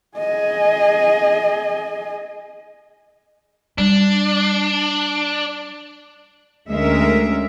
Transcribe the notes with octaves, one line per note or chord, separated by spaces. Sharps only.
G#4 D#5
G3 D4
D2 G#3 C#4 A#4 E5